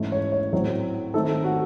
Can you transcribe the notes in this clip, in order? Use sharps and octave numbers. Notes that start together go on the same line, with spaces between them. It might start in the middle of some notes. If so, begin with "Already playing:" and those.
Already playing: G#2 E3 A3 C#4
C#5
C#5
A2 F#3 C4 C#5
D#3 A3 C4 D#4 A4
F#4